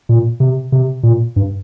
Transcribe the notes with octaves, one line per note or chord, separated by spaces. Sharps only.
A#2
C3
C3
A#2
G2